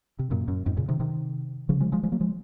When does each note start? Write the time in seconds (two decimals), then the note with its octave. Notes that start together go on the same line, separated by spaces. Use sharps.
0.19 C3
0.31 F#2 A#2
0.48 F#2
0.66 F2 G#2
0.77 A#2 C#3
0.89 C3 D#3
1.00 C3 D#3
1.69 C#3 F3
1.80 F3 G#3
1.92 F3 G#3
2.03 F3 G#3
2.12 F#3 A#3
2.21 F3 G#3